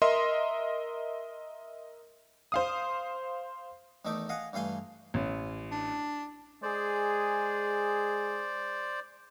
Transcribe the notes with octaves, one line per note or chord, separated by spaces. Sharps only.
A#4 D#5 E5 C6
C5 F5 D#6
E2 D#3 A3 D#4 E5 D6
D#5 F5 F#5 G#5
G2 E3 A3 F5 G#5 C6
A1
D4
G#3 G#4 C5 D5